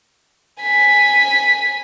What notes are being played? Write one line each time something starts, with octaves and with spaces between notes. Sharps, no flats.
G#5 B6